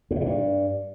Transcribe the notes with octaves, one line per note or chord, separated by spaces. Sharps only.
G2
B2
C3
G2